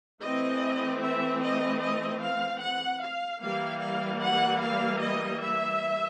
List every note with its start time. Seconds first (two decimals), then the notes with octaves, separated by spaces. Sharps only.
0.23 E3 A3 C4 D#5
1.03 E5
1.44 D#5
1.83 D#5
2.23 F5
2.63 F#5
3.03 F5
3.43 E3 G3 A#3 F5
3.83 F5
4.23 F#5
4.63 F5
5.03 D#5
5.43 E5